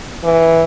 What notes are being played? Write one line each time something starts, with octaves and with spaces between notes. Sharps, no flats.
E3